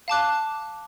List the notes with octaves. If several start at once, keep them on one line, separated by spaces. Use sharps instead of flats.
F5 A5 D6 F#6